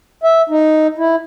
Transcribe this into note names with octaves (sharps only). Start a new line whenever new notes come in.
E5
D#4
E4